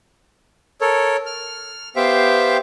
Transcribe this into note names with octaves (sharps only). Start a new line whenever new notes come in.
A4 A#4 C#5
F6
B3 G4 C5 E5 F5 G5